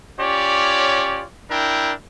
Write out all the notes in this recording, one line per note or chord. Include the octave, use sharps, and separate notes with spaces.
C#4 F4 G4 C#5 D5
D4 E4 A#4 G5